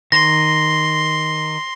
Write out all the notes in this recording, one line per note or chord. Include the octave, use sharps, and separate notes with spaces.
D#3 C6 A#6